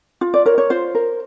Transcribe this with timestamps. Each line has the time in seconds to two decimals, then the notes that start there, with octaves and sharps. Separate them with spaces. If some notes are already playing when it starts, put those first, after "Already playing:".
0.21 F4
0.34 D5
0.46 A#4 C#5
0.58 C#5
0.70 F4 C5
0.95 A#4